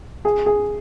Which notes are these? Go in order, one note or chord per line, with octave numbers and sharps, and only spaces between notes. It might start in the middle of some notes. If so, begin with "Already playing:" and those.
G#4
G#4